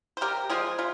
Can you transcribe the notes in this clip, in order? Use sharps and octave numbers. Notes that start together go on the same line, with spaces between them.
C5
C3 G4 A#4
F3 G#3 C4 F4 G#4
C3 F4